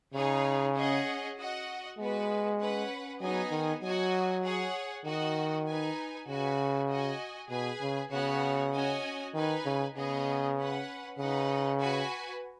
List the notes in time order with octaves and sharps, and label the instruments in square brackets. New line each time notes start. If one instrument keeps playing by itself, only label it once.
[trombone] C#3 [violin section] D#4 G#4 C#5
[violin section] C#4 G#4 D#5 F#5
F#4 D#5 F#5
[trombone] G#3 [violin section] B3 F#4 B4
[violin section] C#4 B4 F#5
[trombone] F#3 [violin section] B3 D#4 G#4 D#5 G#5
[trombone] D#3
[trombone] F#3 [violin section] F#4 D#5 G#5
[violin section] G#4 C#5 F#5
[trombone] D#3 [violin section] F#4 D#5 F#5
[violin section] D#4 B4 G#5
[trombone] C#3 [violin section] F#4 B4 G#5
[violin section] F#4 D#5 G#5
[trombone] B2 [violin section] G#4 B4 G#5
[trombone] C#3
[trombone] C#3 [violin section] B3 F#4 C#5 F#5
[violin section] C#4 F#4 D#5 G#5
[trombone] D#3 [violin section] D#4 B4 G#5
[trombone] C#3
[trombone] C#3 [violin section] B3 G#4 D#5
[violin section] C#4 B4 F#5
[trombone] C#3 [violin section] D#4 B4 D#5 F#5
[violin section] F#4 B4 G#5